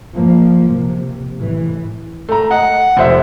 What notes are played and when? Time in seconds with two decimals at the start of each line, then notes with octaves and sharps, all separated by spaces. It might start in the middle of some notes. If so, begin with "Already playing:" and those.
0.15 F3 A#3
0.71 C3
1.38 A2 E3
2.29 A3 A#5
2.51 D#5 F#5
2.97 F1 C5 E5